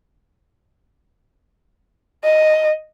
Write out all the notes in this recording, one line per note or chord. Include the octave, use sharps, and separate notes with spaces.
D#5